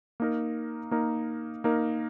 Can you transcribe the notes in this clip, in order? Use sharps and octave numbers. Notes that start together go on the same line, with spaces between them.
A#3 D#4 A#4
A#3 D#4 A#4
A#3 D#4 A#4